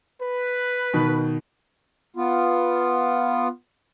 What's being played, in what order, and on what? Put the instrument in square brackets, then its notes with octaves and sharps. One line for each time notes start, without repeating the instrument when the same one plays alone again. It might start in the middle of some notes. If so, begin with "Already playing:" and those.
[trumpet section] B4
[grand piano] B2 D#3
[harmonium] B3 F4